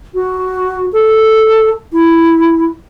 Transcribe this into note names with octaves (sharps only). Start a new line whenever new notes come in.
F#4
A4
E4